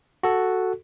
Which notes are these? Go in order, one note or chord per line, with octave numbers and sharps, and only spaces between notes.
F#4 A4